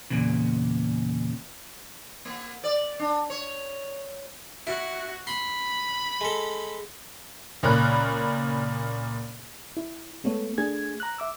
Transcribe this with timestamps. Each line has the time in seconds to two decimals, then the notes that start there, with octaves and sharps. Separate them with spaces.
0.10 E2 A#2 C#3
2.25 A#3
2.64 D5
2.99 D4
3.30 C#5
4.67 E4 F#4
5.27 B5 C6
6.21 G#3 A4
7.63 C#2 A#2 A#4 C#5 B5 F#6
9.77 E4
10.24 G#3 A3 B3 A4 C#5
10.58 A3 D4 G#4 G#5 G#6
11.00 A#5 F#6
11.18 E5 D6 E6